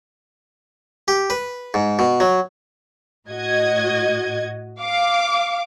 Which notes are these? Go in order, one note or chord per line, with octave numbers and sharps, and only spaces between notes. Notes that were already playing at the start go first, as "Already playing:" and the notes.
G4
B4
G#2
B2
F#3
A2 F#4 D#5 G#6
F5 D6